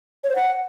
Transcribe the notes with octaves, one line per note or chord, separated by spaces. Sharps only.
C#5
C5
F#5